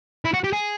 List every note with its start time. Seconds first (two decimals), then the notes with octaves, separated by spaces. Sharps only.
0.25 E4
0.34 F#4
0.44 G4
0.53 G#4